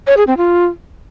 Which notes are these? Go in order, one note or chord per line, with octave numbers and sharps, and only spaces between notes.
C#5
G#4
C4
F4